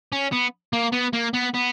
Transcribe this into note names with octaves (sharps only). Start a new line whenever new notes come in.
C#4
B3
A#3
B3
A#3
B3
B3